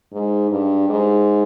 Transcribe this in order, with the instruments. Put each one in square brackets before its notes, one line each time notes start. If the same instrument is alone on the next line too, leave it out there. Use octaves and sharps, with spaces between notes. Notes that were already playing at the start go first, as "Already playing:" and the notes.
[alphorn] G#2
G2
G#2